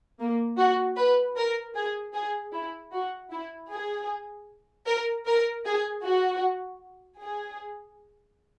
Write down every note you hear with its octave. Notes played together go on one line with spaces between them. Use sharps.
A#3
F#4
B4
A#4
G#4
G#4
E4
F#4
E4
G#4
A#4
A#4
G#4
F#4
G#4